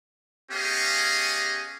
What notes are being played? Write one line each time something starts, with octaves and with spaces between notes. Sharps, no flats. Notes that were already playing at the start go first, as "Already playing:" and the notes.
B3 C#4 G4 G#4 D#5 F5